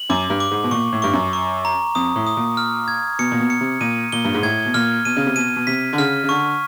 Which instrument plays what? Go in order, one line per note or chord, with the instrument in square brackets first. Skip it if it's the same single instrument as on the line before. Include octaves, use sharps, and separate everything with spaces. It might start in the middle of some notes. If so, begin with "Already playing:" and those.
Already playing: [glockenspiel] F#7
[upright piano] F#2 [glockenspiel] D6
[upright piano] G2
[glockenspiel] D6
[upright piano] G#2
B2
[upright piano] A#2 [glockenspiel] C#6
[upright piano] A2
[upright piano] G2 [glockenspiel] C#6
[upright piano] F#2
[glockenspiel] C#6
A#5
[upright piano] F2 [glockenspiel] D#6
[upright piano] A2
[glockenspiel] D#6
[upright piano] A#2
[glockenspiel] F6
G#6
[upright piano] B2 [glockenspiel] C#7
[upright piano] A#2
B2
[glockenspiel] C#7
[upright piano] C3
[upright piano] A#2 [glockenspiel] D#7
[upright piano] A#2 [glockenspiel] G7
[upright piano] G2
G#2
[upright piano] A2 [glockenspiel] G#6
[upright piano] B2
[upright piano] A#2 [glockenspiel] F6
[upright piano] B2 [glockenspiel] D#7
[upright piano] C#3
C3
[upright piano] B2 [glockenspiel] D#7
[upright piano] B2
[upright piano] C3 [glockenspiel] B6
[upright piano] D3
[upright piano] C#3 [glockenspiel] F6
[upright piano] C#3
[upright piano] D3 [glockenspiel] C#6